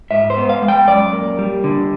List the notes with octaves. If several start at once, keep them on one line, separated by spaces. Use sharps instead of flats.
G#2 E5
C5
B3
F5
G#3
G5
F#2 D5
A#3
G3
D3